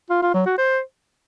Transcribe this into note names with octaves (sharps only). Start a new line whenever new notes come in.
F4
F4
F#3
F#4
C5